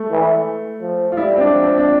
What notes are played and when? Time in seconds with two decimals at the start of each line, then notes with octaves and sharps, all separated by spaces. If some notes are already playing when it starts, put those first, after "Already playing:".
Already playing: A3
0.11 E3
0.82 F3
1.12 F4
1.17 G3 E4
1.36 C4
1.40 D4
1.53 F3
1.64 C4
1.78 D4